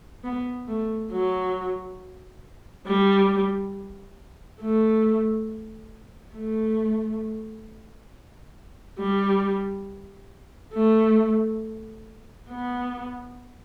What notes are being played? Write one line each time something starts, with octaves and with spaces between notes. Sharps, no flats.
B3
A3
F#3
G3
A3
A3
G3
A3
B3